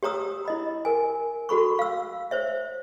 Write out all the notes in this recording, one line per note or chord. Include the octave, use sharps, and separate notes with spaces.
G4 C#5 A#5 D#6 E6
E4 D#5 B5
A#4 G#5
F#4 A4 B5 C#6
F5 E6
C5 C#5 E5